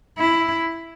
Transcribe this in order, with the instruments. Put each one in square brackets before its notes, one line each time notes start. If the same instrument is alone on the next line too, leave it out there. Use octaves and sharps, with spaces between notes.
[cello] E4